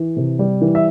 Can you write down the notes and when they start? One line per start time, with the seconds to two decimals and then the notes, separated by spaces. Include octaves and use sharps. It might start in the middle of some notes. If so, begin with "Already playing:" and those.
Already playing: E3
0.17 C3
0.39 G3
0.61 E3
0.75 E5